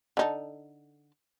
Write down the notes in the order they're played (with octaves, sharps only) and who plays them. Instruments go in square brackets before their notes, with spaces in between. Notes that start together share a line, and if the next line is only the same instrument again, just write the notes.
[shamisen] D3 D#4 A4